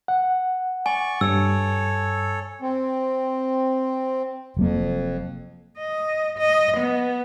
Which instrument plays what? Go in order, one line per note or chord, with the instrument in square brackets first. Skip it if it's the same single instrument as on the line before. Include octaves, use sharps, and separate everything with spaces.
[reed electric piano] F#5
[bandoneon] D5 C#6 [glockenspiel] G#5
[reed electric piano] G2 [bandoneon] A4 C#5 [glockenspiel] E6
[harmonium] C4
[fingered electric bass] F1 F#3 A#3 [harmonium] F2
[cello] D#5
D#5
B3